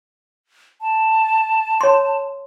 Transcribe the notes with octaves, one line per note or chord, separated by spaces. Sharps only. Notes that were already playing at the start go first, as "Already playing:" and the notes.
A5
C#5 C6